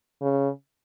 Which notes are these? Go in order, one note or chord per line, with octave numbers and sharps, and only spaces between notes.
C#3